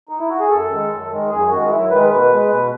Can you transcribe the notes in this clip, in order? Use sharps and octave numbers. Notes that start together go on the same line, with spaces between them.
D#4
E4
F#4
G#4
F#2 A4
D#3 G#3
F#2
D#3 G#3
F#2 G#4
D#3 G#3 F#4
F#2 E4
D#3 G#3 B4
B2 B4
G#3
B2